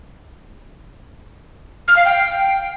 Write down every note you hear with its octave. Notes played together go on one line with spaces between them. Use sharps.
F6
F5
G5